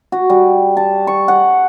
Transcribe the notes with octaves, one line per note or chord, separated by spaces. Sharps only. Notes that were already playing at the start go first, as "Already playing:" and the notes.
F#4
G3
A5
C#6
F#5